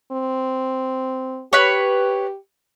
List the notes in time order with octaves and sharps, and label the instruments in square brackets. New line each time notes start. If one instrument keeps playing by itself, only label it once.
[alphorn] C4
[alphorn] G4 [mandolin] B4 C#5